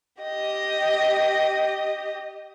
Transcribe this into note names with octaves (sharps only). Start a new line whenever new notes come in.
G4 D#5